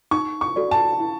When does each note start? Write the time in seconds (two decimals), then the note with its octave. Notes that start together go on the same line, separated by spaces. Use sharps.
0.11 D#4 C#6
0.41 C#6
0.56 F#4 A4 D5
0.71 A5
1.00 E4